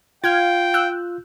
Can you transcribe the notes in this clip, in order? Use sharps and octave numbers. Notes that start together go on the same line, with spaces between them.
F4 F5 G5 F6 G#6
E6 F#6 G6